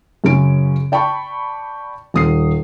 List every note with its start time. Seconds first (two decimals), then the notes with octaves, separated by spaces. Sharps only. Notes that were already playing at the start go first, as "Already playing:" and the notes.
0.24 F#2 C#3 C#4 D7
0.92 D5 G5 A5 B5 C#6
2.14 D#1 D#6 C7